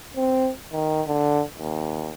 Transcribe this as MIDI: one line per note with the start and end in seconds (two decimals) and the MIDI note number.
0.16 0.50 60
0.72 1.02 51
1.07 1.43 50
1.59 2.14 39